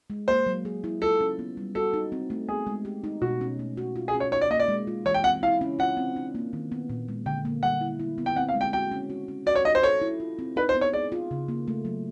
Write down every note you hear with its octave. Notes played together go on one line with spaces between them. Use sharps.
G#3
A#3 C5
F#3
G#4
E4
F4 A4
C#4
B3
G3
F#4 A4
D#4
C4
A3
B3 G#4
G#3
G4
D#4
B2 F#4
C#4
A3
F#4
F4
G#4
C#4
C#5
D#4 C#5
D5
A#3 D#5
D5
G#3
F4
E3 C#5
G5
C4 F#5
E4 F5
C#4
F4 F#5
C4
D4
A#3
D#3
B3
A#2
G#3
D3 G5
A#3
G3 F#5
E4
E4
B3
G5
C4 F#5
F5
G#3
G5
F#4 G5
C#4
F#4
C#4
F#4 D5
C#5
D#4 D#5
C5
A4 C#5
E4
F4
C4
D#4 B4
C5
B3
C#5
G#4 D5
F4
C#3
A#3
A3
F#3